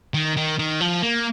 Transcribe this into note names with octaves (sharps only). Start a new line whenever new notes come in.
D#3
D#3
D#3
F3
A#3